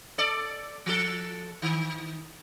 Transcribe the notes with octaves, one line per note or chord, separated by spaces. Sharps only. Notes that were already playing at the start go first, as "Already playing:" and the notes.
A4 D5
F3 A4
D#3